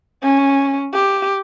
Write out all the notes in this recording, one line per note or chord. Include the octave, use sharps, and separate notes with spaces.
C#4
G4